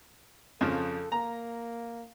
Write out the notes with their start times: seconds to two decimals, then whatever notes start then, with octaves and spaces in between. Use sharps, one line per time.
0.61 F2 C#3 F3 A4
1.12 A#3 A#5